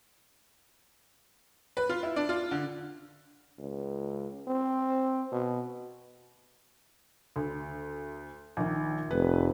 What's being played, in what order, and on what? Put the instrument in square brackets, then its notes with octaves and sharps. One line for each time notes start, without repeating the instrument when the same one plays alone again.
[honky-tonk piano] B4
F4
E4
D4
F4
D3
[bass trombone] C#2
C4
B2
[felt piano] D2
A#1 D#3
[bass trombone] F1 [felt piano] B4